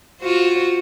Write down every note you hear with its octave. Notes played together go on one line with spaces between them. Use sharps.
F4 F#4 C5